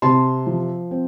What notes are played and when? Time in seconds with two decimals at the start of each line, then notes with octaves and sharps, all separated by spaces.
0.02 C3 A5 C6
0.46 F3
0.91 C4